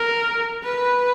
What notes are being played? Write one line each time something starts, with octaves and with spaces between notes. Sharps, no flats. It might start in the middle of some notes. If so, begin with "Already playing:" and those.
Already playing: A#4
B4